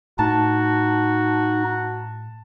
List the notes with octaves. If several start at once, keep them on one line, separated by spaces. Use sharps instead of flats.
A2 D#4 F#4 A5